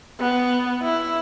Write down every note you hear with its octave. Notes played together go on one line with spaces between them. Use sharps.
B3
E4